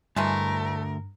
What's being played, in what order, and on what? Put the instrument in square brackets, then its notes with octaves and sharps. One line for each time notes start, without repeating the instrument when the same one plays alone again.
[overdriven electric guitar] D2 [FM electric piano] G2 [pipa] E3 G#3 A3 [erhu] A#4